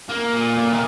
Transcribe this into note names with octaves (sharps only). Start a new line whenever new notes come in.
A#3
A#2
A#2
D#3